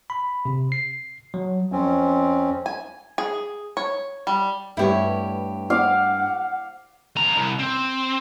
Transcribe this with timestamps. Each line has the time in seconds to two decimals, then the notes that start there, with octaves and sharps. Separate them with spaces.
0.10 B5
0.45 C3
0.72 C7
1.34 F#3
1.72 F2 C4 C#4
2.66 G#5
3.18 G#4
3.77 C#5
4.27 G3
4.77 G2 A3 B3 E4 G4 C#5
5.70 F5 F#5 D6
7.16 F2 A#5
7.36 C2
7.60 C4